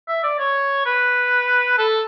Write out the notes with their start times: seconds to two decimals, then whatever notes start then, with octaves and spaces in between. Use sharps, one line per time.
0.09 E5
0.23 D5
0.39 C#5
0.86 B4
1.78 A4